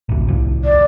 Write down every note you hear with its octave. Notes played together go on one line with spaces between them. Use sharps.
A1 D2
C2 F2
D5